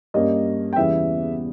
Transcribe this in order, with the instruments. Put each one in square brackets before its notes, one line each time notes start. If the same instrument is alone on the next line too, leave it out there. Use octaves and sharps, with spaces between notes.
[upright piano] G2 G3 A#3 C#4 [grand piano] D#5
[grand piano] G5
[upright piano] E2 C#3 E3 G3 B3 [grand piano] E5